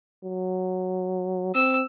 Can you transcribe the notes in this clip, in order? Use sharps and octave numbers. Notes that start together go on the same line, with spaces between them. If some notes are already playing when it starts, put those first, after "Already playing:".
F#3
C4 E6